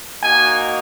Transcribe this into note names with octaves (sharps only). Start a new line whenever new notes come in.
A#3 D#4 F#4 G#5